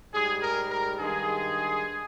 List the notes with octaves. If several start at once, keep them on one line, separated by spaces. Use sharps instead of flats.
G#2 G3 G#4
A#4
A#4
G2 D#3 G#3 G#4